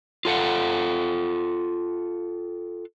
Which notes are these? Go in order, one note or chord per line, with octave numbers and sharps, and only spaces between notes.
F4 A4 F5 F#5